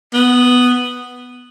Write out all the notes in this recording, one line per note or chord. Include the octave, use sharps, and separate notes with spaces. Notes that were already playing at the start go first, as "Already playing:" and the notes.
B3